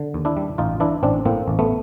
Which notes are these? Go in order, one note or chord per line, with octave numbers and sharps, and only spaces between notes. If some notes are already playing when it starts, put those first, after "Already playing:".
Already playing: D3
D#2
D4 E4
G3
A1 D#4 F4
E3 D4 E4
A1 C4 D4
A2 A#3 C4
A1
A3 B3